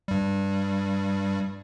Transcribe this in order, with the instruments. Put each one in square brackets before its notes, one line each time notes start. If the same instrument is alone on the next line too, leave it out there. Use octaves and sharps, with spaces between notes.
[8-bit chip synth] G2 G3